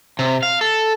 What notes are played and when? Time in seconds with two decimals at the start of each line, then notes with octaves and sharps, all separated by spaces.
0.19 C3
0.43 F5
0.61 A4